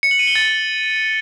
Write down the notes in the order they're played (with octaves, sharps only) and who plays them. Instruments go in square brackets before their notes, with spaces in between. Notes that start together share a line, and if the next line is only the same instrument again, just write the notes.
[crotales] C#7
F#7
D#7
G7
A6